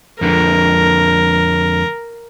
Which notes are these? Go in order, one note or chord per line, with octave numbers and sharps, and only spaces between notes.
F2 D3 G#3 A#4